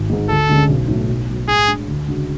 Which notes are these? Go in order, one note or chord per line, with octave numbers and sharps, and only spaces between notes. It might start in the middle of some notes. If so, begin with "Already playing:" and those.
Already playing: G#1
G#2 G#3
D2 A4
D3 G#3 C#4
B1
A2 F#3 A3
B1
B2 F#3
A2 G#4
G#3 D4
D2
C#3 G#3 D4 F#4